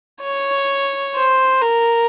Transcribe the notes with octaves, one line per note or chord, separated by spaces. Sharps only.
C#5
C5
A#4